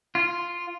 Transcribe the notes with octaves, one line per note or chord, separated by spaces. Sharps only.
F4